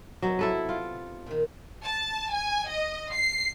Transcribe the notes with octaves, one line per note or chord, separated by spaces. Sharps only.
C3 F#3 B3 D#4
E4 A4 B4
F4 D5
A#2 D#3
A5
G#5
D#5
C7